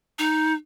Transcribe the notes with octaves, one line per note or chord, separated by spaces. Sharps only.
D#4